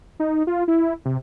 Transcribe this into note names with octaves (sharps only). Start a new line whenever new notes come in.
D#4
F4
E4
C3